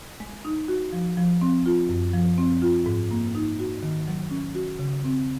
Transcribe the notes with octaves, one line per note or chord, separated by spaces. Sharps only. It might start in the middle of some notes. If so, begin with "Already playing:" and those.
G#3
D#4
F#4
F3
F3
C4
F4
F#2
F3
C4
F4
G#2
A#3
D#4
F#4
D#3
F#3
C#4
F#4
C#3
C4